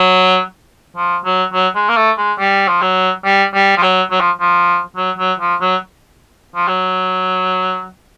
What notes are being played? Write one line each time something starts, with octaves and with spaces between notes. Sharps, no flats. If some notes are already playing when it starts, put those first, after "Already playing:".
Already playing: F#3
F3
F#3
F#3
G#3
A#3
A3
G#3
G3
F3
F#3
G3
G3
F3
F#3
F#3
F3
F3
F#3
F#3
F3
F#3
F3
F#3